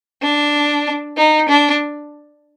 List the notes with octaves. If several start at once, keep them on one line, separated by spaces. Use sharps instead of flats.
D4
D#4
D4